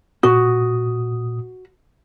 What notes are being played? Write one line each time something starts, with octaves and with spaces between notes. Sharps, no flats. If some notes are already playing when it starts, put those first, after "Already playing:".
A#2 F#4 D#6